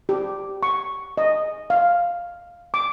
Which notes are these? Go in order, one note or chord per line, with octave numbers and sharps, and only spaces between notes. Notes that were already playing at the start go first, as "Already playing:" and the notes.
G4
C#6
D#5
F5
D6